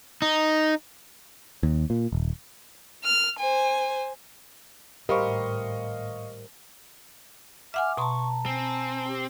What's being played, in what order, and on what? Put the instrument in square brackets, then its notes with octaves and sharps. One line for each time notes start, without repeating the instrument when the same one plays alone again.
[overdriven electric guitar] D#4
[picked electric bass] D#2
A#2
D#1
[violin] F6
C5 G#5
[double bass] G#1 A2 [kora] G3 [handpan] A#4 C5 [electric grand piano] D#5 F5 C#6
[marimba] E5 F#5 G#5 [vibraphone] D6 [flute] F6
[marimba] B2 C6 [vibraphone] A5 A#5 [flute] C#6
[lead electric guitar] C4 [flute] G#5
[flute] G4